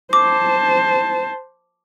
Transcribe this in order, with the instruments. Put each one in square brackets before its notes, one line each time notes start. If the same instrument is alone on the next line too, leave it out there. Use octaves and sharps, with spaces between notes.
[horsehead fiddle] C5 A5 [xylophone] D6